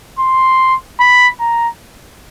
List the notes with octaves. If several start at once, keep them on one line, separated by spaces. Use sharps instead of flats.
C6
B5
A#5